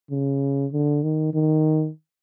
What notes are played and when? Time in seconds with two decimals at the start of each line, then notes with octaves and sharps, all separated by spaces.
0.11 C#3
0.72 D3
1.03 D#3
1.34 D#3